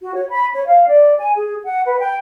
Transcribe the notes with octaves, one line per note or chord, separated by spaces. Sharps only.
F#4
C#5
B5
C#5
F5
D5
G#5
G#4
F#5
B4
G5